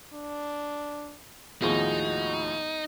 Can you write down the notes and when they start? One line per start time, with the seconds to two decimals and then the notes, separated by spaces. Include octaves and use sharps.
0.13 D4
1.62 D#2 A2 F3 G#3 B3 D#4 F#4 G#4